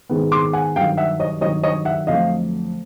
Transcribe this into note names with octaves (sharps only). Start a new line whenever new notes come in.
G#2 D#3 G#3 B3
C6 D6
F#5 G#5
G2 D#3 F#3 F5 G5
E5 F#5
C#5 D#5
G2 D#3 F#3 C#5 D#5
C#5 D#5
E5 F#5
F2 D3 F#3 A3 D#5 F5